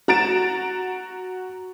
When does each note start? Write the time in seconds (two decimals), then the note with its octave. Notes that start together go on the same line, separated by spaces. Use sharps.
0.08 F#4 A#5 A6 D7 E7